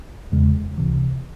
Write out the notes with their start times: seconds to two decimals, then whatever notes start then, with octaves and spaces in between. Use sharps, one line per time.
0.32 E2 C#3 G#3
0.78 C#2 C3 E3